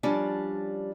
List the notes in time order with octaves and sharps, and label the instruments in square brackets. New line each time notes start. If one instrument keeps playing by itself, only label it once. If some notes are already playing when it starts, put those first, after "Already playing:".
[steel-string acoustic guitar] F3 G3 C#4 D4